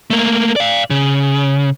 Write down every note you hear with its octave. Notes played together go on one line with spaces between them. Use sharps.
A3 A#3
D5 F5
C#3